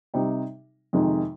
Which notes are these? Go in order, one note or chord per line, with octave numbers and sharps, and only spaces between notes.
C3 G3 C4 D#4
F2 C3 D#3 G#3 D#4